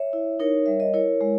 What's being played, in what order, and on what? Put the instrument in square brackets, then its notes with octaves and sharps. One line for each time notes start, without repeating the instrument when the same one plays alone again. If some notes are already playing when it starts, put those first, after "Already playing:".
Already playing: [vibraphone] C#5 E5
E4
D#4 A#4 C#5
G3 E5
D#5
E4 A#4 C#5
G#3